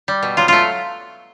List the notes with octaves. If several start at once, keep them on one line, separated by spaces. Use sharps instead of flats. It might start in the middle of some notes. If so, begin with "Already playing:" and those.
G3
B2
F#3 F4
A3 F4